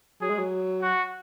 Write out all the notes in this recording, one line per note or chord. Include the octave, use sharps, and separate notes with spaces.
F#3 G#4
G#3
F#3
F#4